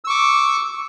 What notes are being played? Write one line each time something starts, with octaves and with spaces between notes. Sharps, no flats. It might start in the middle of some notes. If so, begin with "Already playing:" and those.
C#6 D6 E6